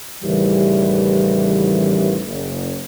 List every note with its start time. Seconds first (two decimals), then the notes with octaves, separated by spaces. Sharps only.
0.22 A1 D#2 C#3 E3 G3
2.26 F#1